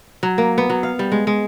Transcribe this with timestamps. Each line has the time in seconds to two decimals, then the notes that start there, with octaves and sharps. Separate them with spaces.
0.23 F#3
0.38 A#3
0.58 B3
0.70 F#3
0.83 F5
0.99 G3
1.12 G#3
1.27 G#3